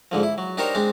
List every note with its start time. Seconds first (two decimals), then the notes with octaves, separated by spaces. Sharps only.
0.11 G#2 D3 F3
0.23 E4
0.38 F#3
0.57 D4 D#4 G4 A#4 C5 C#5
0.75 G#3 C4 D4